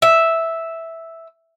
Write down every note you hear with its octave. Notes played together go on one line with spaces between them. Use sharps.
E5